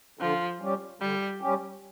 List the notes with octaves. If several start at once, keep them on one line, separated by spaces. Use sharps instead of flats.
D3 F3
G3 C#4 G4
D3 G3
G3 C#4 G4